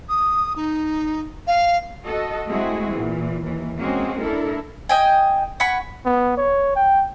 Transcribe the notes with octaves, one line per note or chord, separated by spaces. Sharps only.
D#6
D#4
F5
F#4 A4 D#5
G#3 A3 C4 E4 F#4 G#4
A#2 E3
D#2 E3
G#3 A#3 C4 C#4 F#4 G#4
D4 E4 A4 A#4
D#5 G5 G#5
F#5 G#5 B5 C#6
B3
C#5
G5